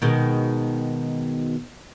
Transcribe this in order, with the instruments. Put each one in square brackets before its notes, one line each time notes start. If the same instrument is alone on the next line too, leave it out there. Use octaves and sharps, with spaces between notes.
[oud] B2 D#3 G#3